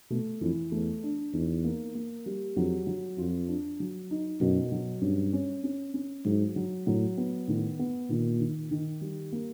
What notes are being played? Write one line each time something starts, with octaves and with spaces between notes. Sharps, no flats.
B2 A3
F2 E3
E2 A3
D4
E2 D#4
A#3
A#3
G3
F2 F#3
F#3
F2 F4
D4
F#3
D#4
F#2 B2
F#3
G2 C#4
C#4
C#4
C#4
G#2 F#3
F#3
A2 F#3
B3
A2 D#3
B3
A#2 D#3
D#3
D#3
G3
A#3